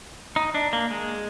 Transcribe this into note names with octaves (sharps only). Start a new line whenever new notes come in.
D#4
D4
A#3
G#3